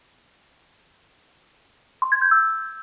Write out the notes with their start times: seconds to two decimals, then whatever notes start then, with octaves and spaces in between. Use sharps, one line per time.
2.02 C6
2.12 G#6
2.22 G6
2.31 E6